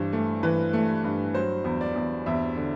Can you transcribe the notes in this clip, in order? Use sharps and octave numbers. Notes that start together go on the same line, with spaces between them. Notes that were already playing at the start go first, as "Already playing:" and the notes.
Already playing: G2 E3 C5
A3
E3 B4
A3
G2
F#3 C5
E2
D5
E2
E2 E5
D3